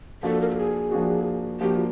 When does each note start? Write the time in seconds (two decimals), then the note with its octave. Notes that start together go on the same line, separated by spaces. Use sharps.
0.23 F3 A#3 D4 F#4 A4
0.41 A#4
0.49 A4
0.58 G#4
0.91 F3 A#3 D4 F#4
1.60 F3 A#3 D4 F#4 G4
1.75 F4